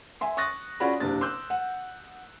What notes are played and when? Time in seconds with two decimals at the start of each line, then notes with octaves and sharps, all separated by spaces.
0.21 E5 G#5 C6
0.37 C#6 D#6 F#6 A6 A#6
0.80 C#4 F4 F#4 G#4 D5 B5
1.00 F#1 C3 A#3 D4 A6
1.21 C6 D6 E6 F#6 G6
1.50 F#5